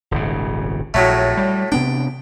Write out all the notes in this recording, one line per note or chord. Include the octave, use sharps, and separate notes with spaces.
D#1 G#1 C#3
A#1 A2 F#3 A3
G3
C3 B3 D4 G5